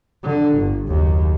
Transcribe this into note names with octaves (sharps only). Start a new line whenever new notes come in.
D3
G1
F#1 D#2